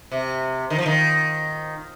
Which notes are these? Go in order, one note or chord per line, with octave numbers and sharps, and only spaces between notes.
C3
D#3
F3
D#3